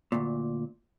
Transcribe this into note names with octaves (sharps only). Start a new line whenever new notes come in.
D2 A#2